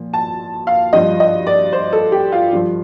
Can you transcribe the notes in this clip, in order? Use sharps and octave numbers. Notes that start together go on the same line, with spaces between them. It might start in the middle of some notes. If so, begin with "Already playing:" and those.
Already playing: A#2 F3
A5
F5
G2 F3 D#5
D#5
D5
C5
A4
G4
F4
G2 F3